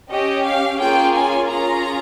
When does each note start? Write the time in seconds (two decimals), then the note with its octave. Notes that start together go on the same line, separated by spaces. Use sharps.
0.10 C#4 G4 D#5
0.45 F5
0.79 A#3 C#4 F4 G#4 G5
1.14 G#5
1.48 C#4 F4 G#4 A#5